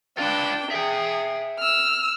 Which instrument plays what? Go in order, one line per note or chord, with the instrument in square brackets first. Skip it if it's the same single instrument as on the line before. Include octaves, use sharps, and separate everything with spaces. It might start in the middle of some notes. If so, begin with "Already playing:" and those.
[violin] D4 G5 [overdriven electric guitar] F4 B4
[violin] G#4 [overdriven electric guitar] E5 G5
[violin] E6 F6